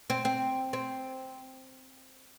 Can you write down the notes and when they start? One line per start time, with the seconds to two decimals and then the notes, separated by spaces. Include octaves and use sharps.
0.10 C4
0.25 C4
0.73 C4